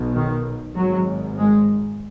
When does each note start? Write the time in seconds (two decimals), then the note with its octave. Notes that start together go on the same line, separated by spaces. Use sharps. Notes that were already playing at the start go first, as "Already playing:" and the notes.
Already playing: B1 B2
0.14 D#3
0.76 G#1 G#2 F#3
1.38 G#3